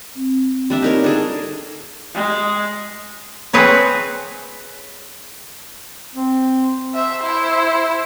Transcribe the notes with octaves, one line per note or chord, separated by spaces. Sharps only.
C4
G3 D4 E5
D#4 A#4 C#5
D4 D#4 G#4 A4
G#3
C4 G#4 B4 C#5
C4
C5 E5
E4